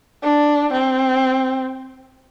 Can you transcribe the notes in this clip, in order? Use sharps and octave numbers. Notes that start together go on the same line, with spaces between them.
D4
C4